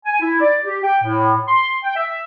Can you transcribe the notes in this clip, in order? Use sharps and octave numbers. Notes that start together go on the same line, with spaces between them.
G#5
E4
D5
G4
G5
A2
C6
G5
E5